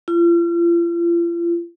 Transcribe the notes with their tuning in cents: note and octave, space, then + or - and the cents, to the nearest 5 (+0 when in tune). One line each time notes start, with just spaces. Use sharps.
F4 -40